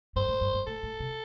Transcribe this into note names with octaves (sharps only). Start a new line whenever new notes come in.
G2 C5
A2
G2
G2
A2 A4
A2
C3